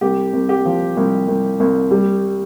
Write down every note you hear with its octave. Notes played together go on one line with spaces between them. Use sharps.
C2 G4
C2
G4
F3
C2
C2
C2
G3